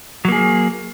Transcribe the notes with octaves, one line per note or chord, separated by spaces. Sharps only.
F#3 A#3 G#4